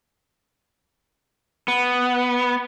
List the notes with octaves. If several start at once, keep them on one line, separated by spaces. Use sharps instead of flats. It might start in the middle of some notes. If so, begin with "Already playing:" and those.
B3